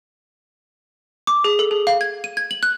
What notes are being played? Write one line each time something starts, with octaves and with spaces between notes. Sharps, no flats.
D6
G#4
A4
G#4
F5
G#6
D#7
G#6
F#7
F#6